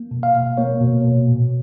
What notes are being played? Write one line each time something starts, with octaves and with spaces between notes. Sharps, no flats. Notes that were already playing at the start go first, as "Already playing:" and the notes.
Already playing: A#3
B2
F5
B2
A#3 C#5
B2
B2
A#2